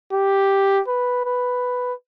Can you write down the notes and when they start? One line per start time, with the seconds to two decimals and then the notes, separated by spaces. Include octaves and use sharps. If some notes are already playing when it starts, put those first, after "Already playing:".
0.13 G4
0.88 B4
1.26 B4